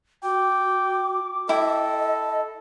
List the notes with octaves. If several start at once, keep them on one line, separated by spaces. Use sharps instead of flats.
F#4 G5 D6
E4 A4 D#5 G5